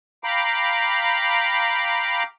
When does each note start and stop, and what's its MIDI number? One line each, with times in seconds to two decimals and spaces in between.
0.24 2.23 77
0.24 2.23 79
0.24 2.23 82
0.24 2.23 83
0.24 2.23 86